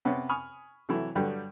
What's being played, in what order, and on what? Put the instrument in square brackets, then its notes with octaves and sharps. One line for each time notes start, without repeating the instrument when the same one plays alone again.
[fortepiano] C3 B3 C#4
G#5 B5 C#6 D#6 F6
C3 E3 F#3 A3 E4
G2 D3 F#3 G3